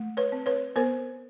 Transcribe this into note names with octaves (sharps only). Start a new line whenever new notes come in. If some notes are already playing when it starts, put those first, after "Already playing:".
Already playing: A3
B4 C#5
C4
B4 C#5
B3 A#4 C5